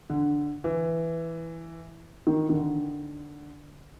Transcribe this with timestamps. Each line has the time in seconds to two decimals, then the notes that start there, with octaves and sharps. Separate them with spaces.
0.10 D3
0.64 E3
2.27 D#3
2.49 D#3
2.53 D3